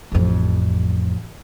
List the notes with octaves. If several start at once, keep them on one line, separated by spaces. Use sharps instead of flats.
A1 F2